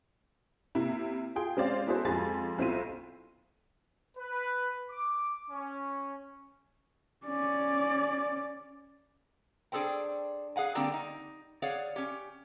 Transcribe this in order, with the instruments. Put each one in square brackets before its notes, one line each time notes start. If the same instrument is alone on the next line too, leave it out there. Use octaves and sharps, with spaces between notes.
[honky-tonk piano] C3 A#3 E4
F4 G#4 G5
G#3 C4 C#4 D5 F5
B3 E4 F#4 G#4 A4 C5
F2 G#3 F4 G4 G#5 A6
B1 C4 E4 F4 D#7
[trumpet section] B4
D6
C#4
[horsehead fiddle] C#4 D5
[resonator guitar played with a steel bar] D4 G#4 A4 C5 G5
G#4 F5 F#5 G#5
D3 G3 A#3 C4 D4 G4
D#4
G#4 C#5 D5 F5 F#5
C#4 G4